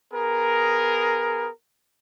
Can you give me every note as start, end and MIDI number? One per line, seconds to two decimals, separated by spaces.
0.14 1.49 59
0.14 1.49 68
0.14 1.49 70